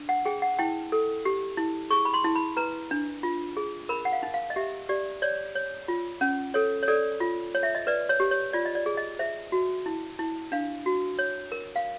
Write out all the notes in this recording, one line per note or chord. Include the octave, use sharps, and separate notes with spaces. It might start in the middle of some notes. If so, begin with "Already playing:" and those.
Already playing: D4
F#5
G#4 G5
F#5
E4 G5
A4
G4
E4
G#4 C#6
B5
C6
E4
B5
B4 A#5
D4
F4
G#4
A#4 B5
F#5
F5
D#4
F5
D#5
G4 E5
G4 D5
C#5 D5
C#5
F4
C#4
A4 C#5
C#5
A4 D5
F4
C#5
E5
D#5
B4 D5
C#5
G4
C#5
F4 D5
D#5
D5
G#4
D#5
C5 E5
F#4
E4
E4
D4 F5
F#4
C#5
A#4
F5